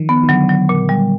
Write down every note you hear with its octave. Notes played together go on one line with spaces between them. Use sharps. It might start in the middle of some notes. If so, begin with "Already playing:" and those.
Already playing: D#3 F3
B3
D#3
D3 F#3
F#3
A#2
G3